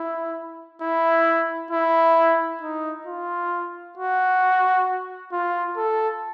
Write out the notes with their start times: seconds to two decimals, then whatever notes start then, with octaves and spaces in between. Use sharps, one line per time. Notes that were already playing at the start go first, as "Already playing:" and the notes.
Already playing: E4
0.82 E4
1.71 E4
2.62 D#4
3.07 F4
3.97 F#4
5.32 F4
5.77 A4